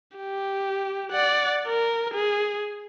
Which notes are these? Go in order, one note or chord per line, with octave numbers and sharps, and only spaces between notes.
G4
D5 F#5
A#4
G#4